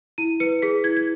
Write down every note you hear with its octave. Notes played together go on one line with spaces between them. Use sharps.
E4 D#7
B4 C#7
G#4 B6
E4 G#6
G#6